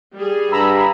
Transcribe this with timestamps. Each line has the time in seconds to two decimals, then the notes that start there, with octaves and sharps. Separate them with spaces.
0.13 G3 G#4
0.52 G2 A#5 B5 E6